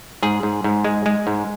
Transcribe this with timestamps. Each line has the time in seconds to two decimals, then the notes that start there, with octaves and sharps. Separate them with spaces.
0.23 G#2 G#4
0.43 G#2
0.64 G#2
0.84 G#3
1.06 G#3
1.27 G#2